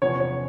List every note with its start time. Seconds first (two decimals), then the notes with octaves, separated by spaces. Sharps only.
0.02 E2 C3 F3 C#5
0.20 C#5